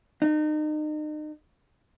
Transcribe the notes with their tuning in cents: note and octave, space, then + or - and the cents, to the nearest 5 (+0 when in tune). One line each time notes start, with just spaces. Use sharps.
D#4 -35